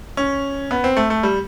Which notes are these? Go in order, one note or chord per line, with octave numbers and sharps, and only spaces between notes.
C#4
B3
C4
A3
A3
G3